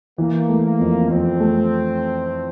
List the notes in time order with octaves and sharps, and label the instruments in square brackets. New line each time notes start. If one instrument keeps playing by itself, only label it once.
[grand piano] E3 [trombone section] A#3
[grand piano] A3
[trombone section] A#3
[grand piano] F2
[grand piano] F2 [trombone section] C4
[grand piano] A3